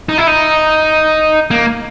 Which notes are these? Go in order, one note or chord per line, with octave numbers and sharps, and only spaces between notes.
D#4
E4
D#4
A#3